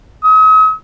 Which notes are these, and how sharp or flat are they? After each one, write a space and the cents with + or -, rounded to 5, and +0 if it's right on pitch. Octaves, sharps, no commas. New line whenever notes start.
D#6 +45